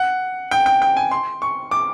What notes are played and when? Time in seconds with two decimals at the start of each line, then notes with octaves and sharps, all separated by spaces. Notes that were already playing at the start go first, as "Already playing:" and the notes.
Already playing: F#5
0.51 G5
0.66 G5
0.82 G5
0.97 G#5
1.11 C6
1.42 C#6
1.71 D6